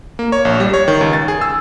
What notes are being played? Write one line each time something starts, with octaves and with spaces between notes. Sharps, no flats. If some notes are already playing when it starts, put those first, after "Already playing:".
A#3
C#5
A#1
G3
C#5
D#3
C#2
A6
G#4
E6